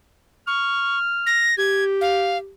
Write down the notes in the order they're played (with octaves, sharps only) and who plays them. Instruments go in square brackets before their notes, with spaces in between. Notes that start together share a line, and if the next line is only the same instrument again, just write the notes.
[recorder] C#6 [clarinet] F6
[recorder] A#6
[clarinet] G4 [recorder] G#6
[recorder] F5